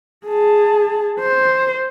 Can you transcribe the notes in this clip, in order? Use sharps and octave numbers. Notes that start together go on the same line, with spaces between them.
G#4 A5
C5